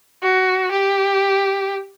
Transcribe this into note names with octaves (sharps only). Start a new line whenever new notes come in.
F#4
G4